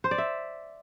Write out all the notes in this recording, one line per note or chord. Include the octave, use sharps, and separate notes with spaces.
C5
D5
E5